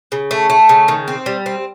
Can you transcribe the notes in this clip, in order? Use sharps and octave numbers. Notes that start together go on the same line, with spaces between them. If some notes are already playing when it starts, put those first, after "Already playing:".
C#3
A3
A3
C#3
D#3
C4
G3
C4